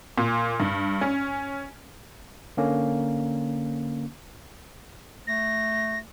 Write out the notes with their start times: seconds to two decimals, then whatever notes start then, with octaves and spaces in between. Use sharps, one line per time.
0.18 A#2
0.60 G2
1.01 C#4
2.57 D3 A#3 C#4
5.27 A3 A#6